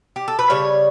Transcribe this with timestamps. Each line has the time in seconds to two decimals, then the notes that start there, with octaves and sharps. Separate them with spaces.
0.16 G4
0.28 A4
0.39 B4
0.50 C#3 G3 C#5